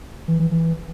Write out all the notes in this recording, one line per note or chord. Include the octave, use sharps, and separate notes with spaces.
E3
E3
E3